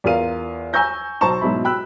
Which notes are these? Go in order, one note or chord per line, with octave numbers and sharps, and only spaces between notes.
E2 F4 A#4 F5 D#7
G#5 A#5 C#6 E6 G6 A#6
B1 C5 A5 A#5 C#6 E7
G#2 B2 F#3 E4 B5
G5 B5 E6 F#6